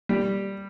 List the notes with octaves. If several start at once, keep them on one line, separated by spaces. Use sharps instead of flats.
G3